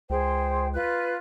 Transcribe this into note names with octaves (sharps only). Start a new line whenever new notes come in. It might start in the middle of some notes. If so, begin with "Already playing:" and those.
C#2 G#4 C5 G5
F4 B4 F#6